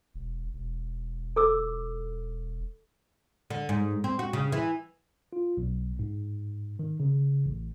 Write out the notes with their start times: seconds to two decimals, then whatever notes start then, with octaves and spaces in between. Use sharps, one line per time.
0.14 E1
0.53 E1
1.36 A4 D6 E6
3.50 D3
3.69 G#2
4.04 C4
4.19 F#4
4.33 C#3
4.52 E3
5.33 F4
5.57 B1
5.99 G#2
6.79 D#3
7.00 C#3
7.46 A1